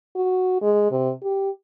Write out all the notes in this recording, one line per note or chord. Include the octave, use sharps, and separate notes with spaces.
F#4
G#3
C3
G4